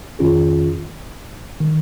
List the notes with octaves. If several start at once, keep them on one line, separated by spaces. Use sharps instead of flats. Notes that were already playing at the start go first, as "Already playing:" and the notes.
F2 D#3 C#4 F4 G#4
D#3